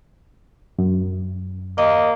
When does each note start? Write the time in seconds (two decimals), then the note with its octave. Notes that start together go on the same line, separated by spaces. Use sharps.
0.79 F#2
1.78 A#3 D#5